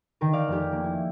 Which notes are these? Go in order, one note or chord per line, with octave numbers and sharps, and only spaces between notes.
D#3 A#4
D5 F5
F1 G4
A#3
E4